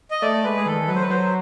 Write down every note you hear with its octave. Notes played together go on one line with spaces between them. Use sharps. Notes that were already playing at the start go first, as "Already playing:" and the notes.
D#5
A3 D5
G#3 B4
G#4
D#3 A4
F#3 B4
C5
B4
F#3 C5